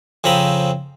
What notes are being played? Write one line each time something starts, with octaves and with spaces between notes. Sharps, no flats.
F2 C#3 C4 A#5 B5 D#6